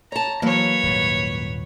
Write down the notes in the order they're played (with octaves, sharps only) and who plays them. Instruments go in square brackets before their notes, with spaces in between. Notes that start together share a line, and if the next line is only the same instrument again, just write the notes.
[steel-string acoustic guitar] C#5 A5 [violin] A#5
[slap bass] E3 [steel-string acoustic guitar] F#3 A#3 [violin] B4 C#5
[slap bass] D#1 G#2